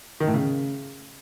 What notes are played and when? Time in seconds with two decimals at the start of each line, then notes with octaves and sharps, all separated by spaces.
0.20 D#3
0.27 A2
0.34 C#3